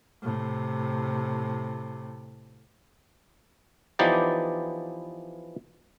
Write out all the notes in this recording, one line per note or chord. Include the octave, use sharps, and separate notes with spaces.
A2 C3
E3 F3 B3 D#4 G4 D5